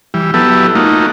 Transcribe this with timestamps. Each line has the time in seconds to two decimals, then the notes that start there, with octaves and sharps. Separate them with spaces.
0.14 E3 G3
0.34 F#3 B3 E4 G4 A4
0.75 A3 A#3 D#4 F4 F#4